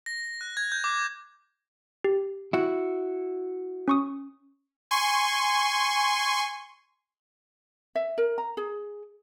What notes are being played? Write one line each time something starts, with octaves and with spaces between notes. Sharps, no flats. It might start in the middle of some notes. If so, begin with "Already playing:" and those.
A#6
F#6
G#6
G6
D6
G4
E4 F#4
C#4 C#6 D#6
G#5 C6 C#6
E5
A#4
A#5
G#4